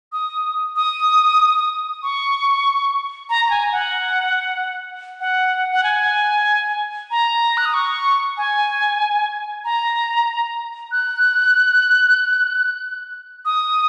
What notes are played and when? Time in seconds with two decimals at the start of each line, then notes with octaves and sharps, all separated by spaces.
0.12 D#6
0.76 D#6
2.03 C#6
3.30 A#5
3.45 A#5
3.50 G#5
3.72 F#5
5.20 F#5
5.72 F#5
5.83 G#5
7.11 A#5
7.57 F#6
7.65 D#6
7.74 C#6
8.37 G#5
9.65 A#5
10.92 F#6
13.45 D#6